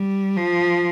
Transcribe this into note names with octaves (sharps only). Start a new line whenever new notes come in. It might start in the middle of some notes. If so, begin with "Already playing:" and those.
Already playing: G3
F3